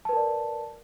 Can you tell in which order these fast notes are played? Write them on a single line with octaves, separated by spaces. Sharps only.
A5 B4 A#4 D5